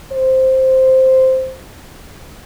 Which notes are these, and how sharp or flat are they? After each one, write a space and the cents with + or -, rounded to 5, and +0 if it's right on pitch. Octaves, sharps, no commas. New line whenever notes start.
C5 +0